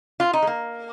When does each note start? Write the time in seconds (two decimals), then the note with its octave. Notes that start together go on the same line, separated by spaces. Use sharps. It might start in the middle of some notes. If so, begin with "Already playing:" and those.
0.20 F4
0.33 D#4
0.42 G#3
0.47 A#3